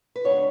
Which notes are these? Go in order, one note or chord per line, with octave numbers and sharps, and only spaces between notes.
B4
C#3 G#3 B3 D4 C#5